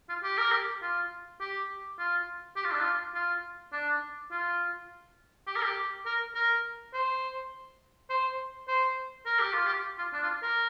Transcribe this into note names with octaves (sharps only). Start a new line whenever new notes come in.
F4
G4
A#4
G4
F4
G4
F4
G4
F4
D4
F4
F4
D4
F4
G4
A#4
G4
A#4
A#4
C5
C5
C5
A#4
G4
F4
G4
F4
D4
F4
A#4